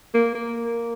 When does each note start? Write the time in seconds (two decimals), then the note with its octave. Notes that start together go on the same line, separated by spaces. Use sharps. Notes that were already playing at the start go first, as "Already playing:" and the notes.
0.14 A#3
0.35 A#3